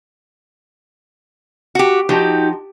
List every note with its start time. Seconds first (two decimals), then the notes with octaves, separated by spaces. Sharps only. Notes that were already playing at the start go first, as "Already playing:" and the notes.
1.75 F#4 G4
2.09 F3 D#4 F#4 G4